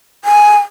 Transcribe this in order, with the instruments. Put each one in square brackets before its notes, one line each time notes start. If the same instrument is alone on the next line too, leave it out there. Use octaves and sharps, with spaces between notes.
[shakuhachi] G#5